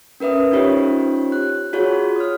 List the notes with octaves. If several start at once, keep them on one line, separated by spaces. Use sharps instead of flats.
C#4 A#4 B4 E5 D#6
C#4 D#4 F4 G4 C5 C#5
F#6
F4 F#4 G#4 C#5
D#6 F6